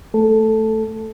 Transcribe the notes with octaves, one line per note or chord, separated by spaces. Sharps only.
A3 A4